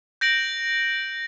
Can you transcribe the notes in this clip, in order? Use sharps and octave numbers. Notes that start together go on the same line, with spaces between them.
G6 A#6 D7 F#7